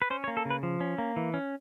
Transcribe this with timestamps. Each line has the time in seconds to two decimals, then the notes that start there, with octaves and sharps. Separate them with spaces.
0.02 B4
0.10 C#4 C5
0.24 C#5
0.28 A#3
0.37 A4
0.45 C#3
0.50 B4
0.63 F3
0.81 C#4
0.98 A#3
1.16 E3
1.34 C#4